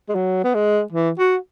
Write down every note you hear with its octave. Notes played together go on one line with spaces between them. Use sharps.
G#3
F#3
B3
G#3
E3
F#4